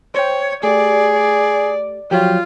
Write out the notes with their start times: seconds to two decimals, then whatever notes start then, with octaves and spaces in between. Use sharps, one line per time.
0.14 C5 C#5 G5
0.63 A3 G4 G#4 D5
1.14 D5
2.11 F3 F#3 F4 G4 C#5